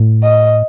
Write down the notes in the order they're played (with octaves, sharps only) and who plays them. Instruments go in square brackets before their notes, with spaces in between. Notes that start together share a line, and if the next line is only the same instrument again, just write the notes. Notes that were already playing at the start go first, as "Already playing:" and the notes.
Already playing: [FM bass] A2
[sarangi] D#5